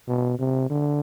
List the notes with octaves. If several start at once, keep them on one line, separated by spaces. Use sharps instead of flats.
B2
C3
D3